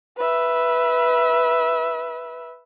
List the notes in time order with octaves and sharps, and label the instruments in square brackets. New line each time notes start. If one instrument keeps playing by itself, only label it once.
[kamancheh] B4 E5